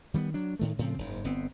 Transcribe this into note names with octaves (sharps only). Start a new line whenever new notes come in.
D#3 G3 A3 B3
F#3 D4
A2 D#3 A3
A2 C#3 F3 C4
F#1 G#2
G1 B3 C4